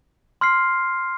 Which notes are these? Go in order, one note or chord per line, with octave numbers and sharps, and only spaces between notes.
C6 F6 C7